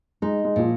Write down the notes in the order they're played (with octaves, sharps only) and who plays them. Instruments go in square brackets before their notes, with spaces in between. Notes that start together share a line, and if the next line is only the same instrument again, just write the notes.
[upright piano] G#3 [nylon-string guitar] D#4
[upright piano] G#3
[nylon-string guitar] A#2 [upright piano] F3